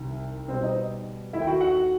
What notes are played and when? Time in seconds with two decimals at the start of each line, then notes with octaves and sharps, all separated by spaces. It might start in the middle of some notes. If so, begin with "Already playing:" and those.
Already playing: C2 C3 D#3
0.48 B2 G3 B3 C4 C5
0.63 D#4 D#5
1.33 D#2 D#3 A3 E4 E5
1.42 G5
1.47 F#4 F#5
1.61 F#4 F#5